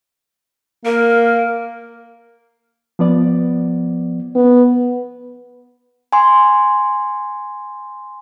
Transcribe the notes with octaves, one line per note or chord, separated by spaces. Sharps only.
A#3 A#4
F3 B3 D5
B3
G#5 C6